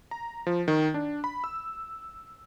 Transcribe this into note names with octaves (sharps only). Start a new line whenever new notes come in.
A#5
F3
D#3
D4
B5
E6